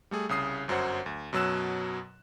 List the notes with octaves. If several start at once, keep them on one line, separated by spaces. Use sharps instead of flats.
G3 A3 G#4
C2 C#3 D#6 C7
G1 F#2 F#3 C5 F#5
D2
F#2 B2 F#3 E6 F#6 E7